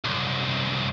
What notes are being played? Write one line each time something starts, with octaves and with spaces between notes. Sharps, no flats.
C2 F#2